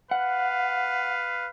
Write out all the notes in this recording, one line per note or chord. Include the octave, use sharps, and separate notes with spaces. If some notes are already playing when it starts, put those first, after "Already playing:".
B4 F5 F#5